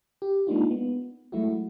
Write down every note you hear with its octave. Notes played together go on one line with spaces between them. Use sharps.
G4
G#3 A#3 D4 D#4 F4
B3
F#3 G#3 A3 E4 F#4